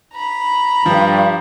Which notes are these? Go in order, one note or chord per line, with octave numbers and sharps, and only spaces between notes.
A#5 B5
G2 F3